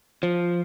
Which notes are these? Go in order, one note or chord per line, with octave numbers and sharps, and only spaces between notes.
F3